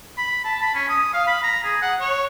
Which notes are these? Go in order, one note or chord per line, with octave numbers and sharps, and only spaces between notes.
B5
A5
B5
C#4
D#6
F5
B5
A#5
G#4
F#5
C#5